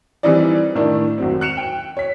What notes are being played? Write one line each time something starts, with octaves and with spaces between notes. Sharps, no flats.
E3 G3 C4 D#4 E4 D5
A2 D#3 D4 E4
G#1 F#3 C4
F#6 C#7 E7 F7
G5
C#5 B6